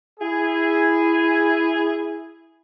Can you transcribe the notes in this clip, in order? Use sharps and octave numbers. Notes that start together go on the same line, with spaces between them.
E4 G#4